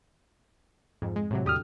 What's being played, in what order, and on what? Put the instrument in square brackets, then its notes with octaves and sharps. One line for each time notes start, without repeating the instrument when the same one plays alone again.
[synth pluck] F2 G#2
G#3
A2 C3 F#3
[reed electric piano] E2 D#6 F6 [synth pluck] D3 G4